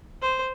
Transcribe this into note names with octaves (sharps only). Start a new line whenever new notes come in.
C5